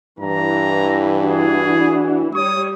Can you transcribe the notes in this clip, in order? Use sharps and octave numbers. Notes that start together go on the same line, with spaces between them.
G2 E3 A#5
D4 F#4 G#4
G3 C#5 D#6